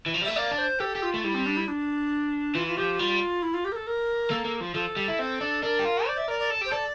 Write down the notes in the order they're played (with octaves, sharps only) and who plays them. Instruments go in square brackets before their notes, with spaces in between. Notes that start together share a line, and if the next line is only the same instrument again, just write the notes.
[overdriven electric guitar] E3
F3
G3
[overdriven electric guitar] A3 [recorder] E5
[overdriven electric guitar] A#3 [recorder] D5
[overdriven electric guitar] D4
[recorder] C5
[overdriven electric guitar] G4 [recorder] A4
[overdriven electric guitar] G4
[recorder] F4
[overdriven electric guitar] A3
[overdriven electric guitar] G3 [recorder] E4
[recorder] C4
D4
E4
D4
[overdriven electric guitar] E3 [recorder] F4
[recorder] F4
[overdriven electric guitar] F3 [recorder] G4
[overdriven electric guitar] G3 [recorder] F4
[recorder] E4
F4
G4
A#4
A4
A#4
[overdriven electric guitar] A#3 [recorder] A4
[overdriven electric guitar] A#3
F3
[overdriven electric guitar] F3 [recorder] A4
[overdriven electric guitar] G3
E4
C4
D4
[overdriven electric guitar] D4 [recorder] A#4
[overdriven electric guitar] G4
F4
[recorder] C5 [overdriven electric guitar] D5
[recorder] E5
[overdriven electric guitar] A#4 [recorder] D5
[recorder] D5
[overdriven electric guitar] A4
[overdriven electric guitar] G4 [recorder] C5
[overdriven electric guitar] A4 [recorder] D5